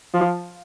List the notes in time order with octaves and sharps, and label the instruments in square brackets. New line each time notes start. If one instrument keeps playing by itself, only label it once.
[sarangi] F3